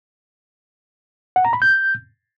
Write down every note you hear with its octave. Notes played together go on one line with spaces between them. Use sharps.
F#5
A#5
B5
G6